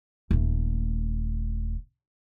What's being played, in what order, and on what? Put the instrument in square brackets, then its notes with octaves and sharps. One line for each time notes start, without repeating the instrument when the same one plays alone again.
[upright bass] D#1 A3